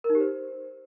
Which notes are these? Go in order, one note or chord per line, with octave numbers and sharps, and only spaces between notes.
A#4
D#4
G4
C5